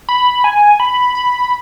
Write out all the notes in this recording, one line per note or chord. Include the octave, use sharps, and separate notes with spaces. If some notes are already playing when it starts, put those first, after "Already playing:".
B5
G#5
B5
B5